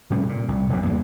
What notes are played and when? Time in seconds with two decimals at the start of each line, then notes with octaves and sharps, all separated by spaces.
0.10 A2 C3 G3 C#4
0.29 A#2
0.48 C2
0.69 F1 B1 G#2 B2
0.85 E2 G2 A#3